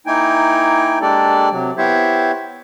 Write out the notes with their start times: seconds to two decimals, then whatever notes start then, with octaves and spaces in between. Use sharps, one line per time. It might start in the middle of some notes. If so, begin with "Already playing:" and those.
0.07 A#3 D#4 E4 G5 G#5
1.01 G#3 A#3 D4 G4 A4 D5
1.51 C3 F#3
1.78 B3 E4 G4 C5 C#5 E5